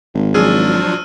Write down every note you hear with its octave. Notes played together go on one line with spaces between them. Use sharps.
G#1
F3 F#3 D4 G#4 E6 F6 D#7
F6